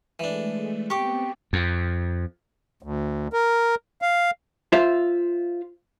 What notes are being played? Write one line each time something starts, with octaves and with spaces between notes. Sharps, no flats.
E3 G#3 A3 D4
B3 C4 G4 C#6 D6
F2
D2
A#4
F5
F4 C5 E5